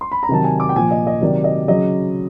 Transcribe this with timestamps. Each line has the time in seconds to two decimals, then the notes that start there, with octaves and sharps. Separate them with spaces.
0.01 C6
0.12 B5
0.23 A#5
0.29 C3 D#3 F#3 A5
0.44 G#5
0.60 D6
0.69 G5
0.75 A#2 F3 G#5
0.91 D#5
1.07 D#5
1.21 C3 D#3 F#3 D5
1.44 D#5
1.68 C#3 F#3 D#5